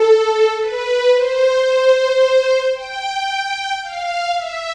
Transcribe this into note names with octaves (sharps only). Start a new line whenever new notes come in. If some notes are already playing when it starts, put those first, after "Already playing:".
Already playing: A4
B4
C5
G5
F5
E5